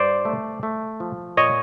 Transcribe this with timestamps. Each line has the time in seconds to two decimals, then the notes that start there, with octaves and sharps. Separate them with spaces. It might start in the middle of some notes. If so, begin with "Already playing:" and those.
Already playing: G2 C5 D5
0.25 A3
0.63 A3
1.00 F3
1.37 A#2 C#5 D#5